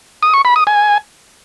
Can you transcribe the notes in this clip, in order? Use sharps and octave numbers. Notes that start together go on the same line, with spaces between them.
D#6
C#6
B5
D#6
G#5